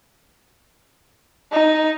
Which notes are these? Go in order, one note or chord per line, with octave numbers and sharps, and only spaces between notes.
D#4